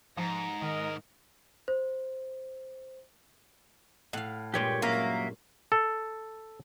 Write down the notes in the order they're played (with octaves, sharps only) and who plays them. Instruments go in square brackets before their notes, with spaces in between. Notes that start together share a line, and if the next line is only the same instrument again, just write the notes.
[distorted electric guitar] G#2 [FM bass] F3 [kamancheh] A#5
[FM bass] D#3 [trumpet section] A#4 D#5
[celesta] C5
[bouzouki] A2 [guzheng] F5 F#5
[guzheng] G2 A#2 G#3 [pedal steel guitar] G4 C#5 G5
[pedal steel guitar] F#3 A#4 E5 [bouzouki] A#3 [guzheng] C#4
[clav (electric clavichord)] A4